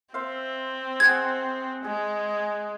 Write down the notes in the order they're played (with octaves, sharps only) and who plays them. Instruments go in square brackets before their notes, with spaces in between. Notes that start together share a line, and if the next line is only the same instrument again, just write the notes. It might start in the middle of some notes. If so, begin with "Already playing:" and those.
[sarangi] C4 [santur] C5 E5 F5
[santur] G#4 C5 F#5 [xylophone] G#6
[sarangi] G#3 [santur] G#4